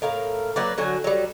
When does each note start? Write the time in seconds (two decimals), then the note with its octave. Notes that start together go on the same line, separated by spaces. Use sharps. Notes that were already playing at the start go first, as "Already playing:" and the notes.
0.02 A2 A#4 F5
0.56 F#3 A#3 B4 D5
0.78 D3 F#3 F#4 G#5
1.04 F#3 G3